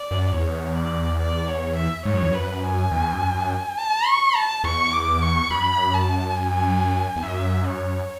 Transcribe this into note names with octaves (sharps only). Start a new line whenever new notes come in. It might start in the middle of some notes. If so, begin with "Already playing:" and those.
Already playing: D5
F#2
E2 C#5
D5
D5
C#5
E5
G#2 C#5
F#2
E2
F#2 B4
G#5
E2
F#2
F#2
A5
C#6
A5
E2 C#6
D6
C#6
F#2 B5
A5
G#5
E2
F#2 E5
C#5